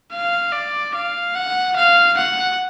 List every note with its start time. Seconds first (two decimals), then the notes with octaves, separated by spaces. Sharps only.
0.12 F5
0.52 D5
0.95 F5
1.35 F#5
1.76 F5
2.17 F#5